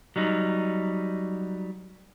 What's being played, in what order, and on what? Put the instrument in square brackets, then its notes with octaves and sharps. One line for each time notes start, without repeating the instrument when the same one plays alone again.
[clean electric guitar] F#3 G3 D#4